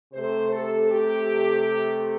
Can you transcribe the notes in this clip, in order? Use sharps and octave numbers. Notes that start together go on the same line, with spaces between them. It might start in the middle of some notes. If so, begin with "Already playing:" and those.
C3 A3 C5
A4
G4